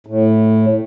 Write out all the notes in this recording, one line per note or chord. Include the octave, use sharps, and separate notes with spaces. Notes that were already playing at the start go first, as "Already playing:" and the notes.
A2